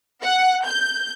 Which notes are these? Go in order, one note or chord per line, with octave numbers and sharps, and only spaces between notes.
F#5
G6